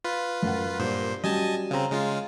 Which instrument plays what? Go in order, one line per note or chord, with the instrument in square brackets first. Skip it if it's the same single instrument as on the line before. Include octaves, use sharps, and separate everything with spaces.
[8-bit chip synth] F4 B4
[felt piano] F#2 F#5
[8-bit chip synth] G2 A#2 C5
[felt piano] F#3 G3 C#4 [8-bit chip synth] D#5 G#5 A5
[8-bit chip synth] C#3 C4 [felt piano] F5 A#5
[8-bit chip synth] C#3 G#3 F4